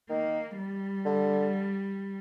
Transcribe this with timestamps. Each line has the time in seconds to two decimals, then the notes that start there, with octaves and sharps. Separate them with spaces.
0.10 D#3 A#3
0.57 G3
1.05 D3